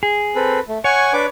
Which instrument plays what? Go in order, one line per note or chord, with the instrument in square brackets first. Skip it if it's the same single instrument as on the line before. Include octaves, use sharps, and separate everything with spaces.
[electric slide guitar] G#4
[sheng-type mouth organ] C4 A4 B4
A3
[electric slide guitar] C#5 [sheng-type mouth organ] F#5 G#5 C#6
[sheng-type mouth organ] D4 B4 D6